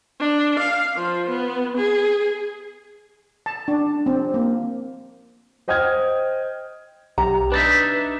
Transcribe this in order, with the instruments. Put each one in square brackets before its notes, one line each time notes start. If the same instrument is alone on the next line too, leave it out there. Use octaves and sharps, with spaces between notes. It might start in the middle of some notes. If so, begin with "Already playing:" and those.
[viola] D4
F5
F3
B3
G#4
[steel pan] A5
D4
C4
A#3
[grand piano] C5 D#5 G5 D#6 F6 G#6
[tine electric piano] B1 G4 [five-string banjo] A#5
[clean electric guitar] D4 D#4 E5 [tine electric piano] B4 A6 B6